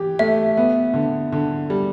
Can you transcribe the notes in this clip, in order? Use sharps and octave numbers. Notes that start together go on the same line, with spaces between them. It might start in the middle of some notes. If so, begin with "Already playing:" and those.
Already playing: E3 G4
A3 E5
B3
D3
D3
G3